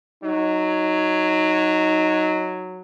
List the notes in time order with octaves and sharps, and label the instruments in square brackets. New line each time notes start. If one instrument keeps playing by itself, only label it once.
[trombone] F#3 [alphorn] D#4